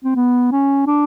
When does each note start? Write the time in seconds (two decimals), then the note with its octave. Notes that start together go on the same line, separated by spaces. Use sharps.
0.04 C4
0.16 B3
0.52 C#4
0.87 D4